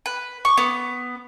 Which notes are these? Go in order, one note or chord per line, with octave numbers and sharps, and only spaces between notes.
B4
C#6
B3